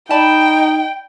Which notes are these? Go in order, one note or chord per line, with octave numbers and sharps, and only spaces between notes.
D#4 D5 G5 A5 B5